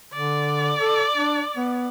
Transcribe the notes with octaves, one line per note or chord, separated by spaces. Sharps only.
D3 D5
A4
D4
B3